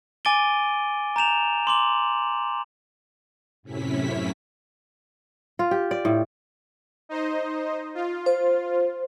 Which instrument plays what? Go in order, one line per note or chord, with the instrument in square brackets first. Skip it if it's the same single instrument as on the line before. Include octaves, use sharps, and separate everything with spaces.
[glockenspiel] G#5 D6 A6 D7 D#7 G7
A#5 G6 E7 F7
C6 D6 F#7
[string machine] F#2 A2 C3 C#4 E4 B6
[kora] F4
G4
D5
A2
[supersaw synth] D#4 C5 D#5
F4
[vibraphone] C5